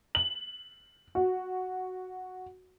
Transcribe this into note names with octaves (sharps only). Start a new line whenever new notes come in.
F#7
F#4